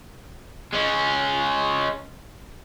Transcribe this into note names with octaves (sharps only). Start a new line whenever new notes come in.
G#3 C#4